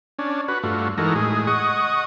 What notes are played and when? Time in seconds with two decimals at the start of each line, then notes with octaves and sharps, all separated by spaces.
0.19 C#4 D4
0.48 F#4 B4
0.63 G2 A3 F4 F#4
0.98 E3 G#3 D#4 F#4 A4 A#4
1.15 A2 G#3 G#4
1.47 D#5 F#5 C#6 D#6